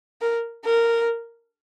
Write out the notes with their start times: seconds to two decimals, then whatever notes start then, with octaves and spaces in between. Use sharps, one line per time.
0.21 A#4
0.65 A#4